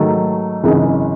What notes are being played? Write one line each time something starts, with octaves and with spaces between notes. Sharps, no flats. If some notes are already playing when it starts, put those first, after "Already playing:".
Already playing: G#2 D#3 F#3 A3
G#1 F#2 C#3 E3 G#3